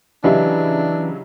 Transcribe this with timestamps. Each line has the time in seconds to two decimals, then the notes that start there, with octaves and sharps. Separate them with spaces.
0.24 C#3 E3 F#3 D4 E4 G4 D#5 F5